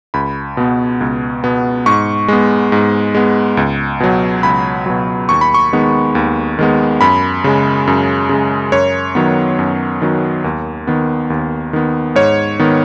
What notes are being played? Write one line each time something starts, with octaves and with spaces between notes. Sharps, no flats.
C#2 B5
B2 B3
C#2
B2 B3
G#2 C#6
G#3 B3
G#2
G#3 B3
C#2
B2 F#3
C#2 B5
B2 F#3
D#2 C#6
B5
C#6
D#3 G#3 B3
D#2
D#3 G#3 B3
F#2 B5
C#3 G#3
F#2
C#3 G#3
F#2 C#5
D#3 F#3 B3
F#2
D#3 F#3 B3
D#2
D#3 B3
D#2
D#3 B3
G#2 C#5
D#3 B3